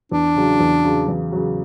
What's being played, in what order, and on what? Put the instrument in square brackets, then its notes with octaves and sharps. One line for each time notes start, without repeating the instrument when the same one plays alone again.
[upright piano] E2 [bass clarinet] D4
[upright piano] C#3 F#3
E2
C#3 F#3
E2
C#3 F#3